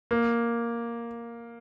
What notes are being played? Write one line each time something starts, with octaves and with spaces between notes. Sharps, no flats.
A#3